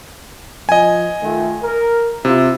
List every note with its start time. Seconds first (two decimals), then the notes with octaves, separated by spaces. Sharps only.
0.69 F3 D#5 G#5
1.22 D#3 A3 F4
1.63 A#4
2.25 C3 E4 F4